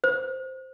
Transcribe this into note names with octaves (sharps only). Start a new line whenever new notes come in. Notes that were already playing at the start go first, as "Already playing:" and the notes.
C5